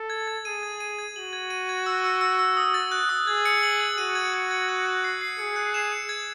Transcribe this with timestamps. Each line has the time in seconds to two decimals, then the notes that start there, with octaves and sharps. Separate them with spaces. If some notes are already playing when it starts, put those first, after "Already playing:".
Already playing: A4
0.10 G#6
0.28 G#6
0.45 G#4 D#7
0.63 G#6
0.80 D#7
0.98 G#6
1.16 F#4 F#7
1.33 G#6
1.50 D#7
1.69 G#6
1.86 E6
2.04 E6
2.21 E6
2.39 E6
2.57 D#6
2.74 A6
2.92 F#6
3.09 D#6
3.27 G#4 G#6
3.45 C#7
3.63 F#7
3.81 G#6
3.98 F#4 D#7
4.15 G#6
4.34 G#6
4.51 G#6
4.69 F#6
4.86 F#6
5.04 C7
5.21 C7
5.39 G#4 C#7
5.56 F#6
5.74 E7
5.92 C#7
6.09 G#6